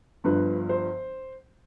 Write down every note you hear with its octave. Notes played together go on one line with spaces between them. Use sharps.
G1 G2 F3 B4
C5